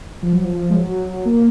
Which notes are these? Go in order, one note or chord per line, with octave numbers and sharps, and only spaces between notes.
F3
F#3
F3
G#3
F#3
A#3